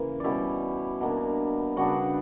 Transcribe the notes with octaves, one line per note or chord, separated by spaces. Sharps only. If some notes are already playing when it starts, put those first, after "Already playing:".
Already playing: C#3 E3 A#3
B2 G3 C#4 E4 D5 E5
B2 A#3 D4
C#3 G3 B3 D4 F#4 F#5